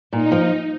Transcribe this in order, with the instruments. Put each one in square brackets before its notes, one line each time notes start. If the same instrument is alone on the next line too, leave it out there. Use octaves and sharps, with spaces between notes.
[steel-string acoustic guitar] A#2 [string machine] D#4
[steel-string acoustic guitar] F3